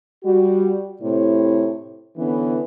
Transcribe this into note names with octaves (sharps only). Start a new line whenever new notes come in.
G3 F#4
A2 C3 E4 C#5
D3 E3 B3 C#4